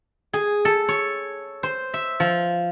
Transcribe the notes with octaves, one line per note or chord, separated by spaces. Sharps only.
G#4
A4
C#5
C5
E5
F3